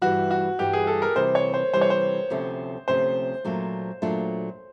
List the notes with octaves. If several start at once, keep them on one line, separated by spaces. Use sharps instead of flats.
G2 E3 G3 F#4
F#4
G2 E3 G3 G4
G#4
A4
A#4
C3 E3 G3 C5
C#5
C5
C3 E3 G3 C5
C#5
C5
D2 C3 F3 A3 C#4
D2 C3 F3 A3 C#4 C5
A#2 F#3 A3 D4 F4
A#2 F#3 A3 D4 F4